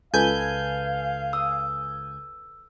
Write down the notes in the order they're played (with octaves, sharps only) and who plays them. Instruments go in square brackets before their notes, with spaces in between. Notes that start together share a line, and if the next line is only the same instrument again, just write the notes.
[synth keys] C#2 G#5 G6 [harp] A4 B4 [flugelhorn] F5
[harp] D#6 [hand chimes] E6